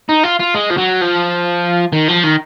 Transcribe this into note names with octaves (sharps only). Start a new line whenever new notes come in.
D#4
F4
F4
G#3
F3
F#3
F3
D#3
F3
D#3